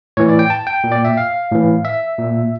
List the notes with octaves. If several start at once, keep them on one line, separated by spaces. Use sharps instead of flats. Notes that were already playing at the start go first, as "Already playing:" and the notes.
A2 E3 C#5
D5
G5
A5
G5
A#2
D5
E5
F5
A2 E3
E5
A#2